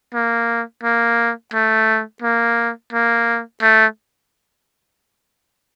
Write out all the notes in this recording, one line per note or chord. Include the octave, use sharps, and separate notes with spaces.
A#3
A#3
A3
A#3
A#3
A3